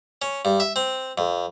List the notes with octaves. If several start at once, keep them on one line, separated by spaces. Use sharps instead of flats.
C#4
G2
E5
C4
F2